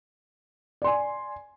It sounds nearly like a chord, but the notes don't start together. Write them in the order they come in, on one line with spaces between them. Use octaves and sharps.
D5 C6 G#5